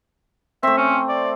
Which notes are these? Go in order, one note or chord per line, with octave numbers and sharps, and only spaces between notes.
A3 C4 E5
C#4
D5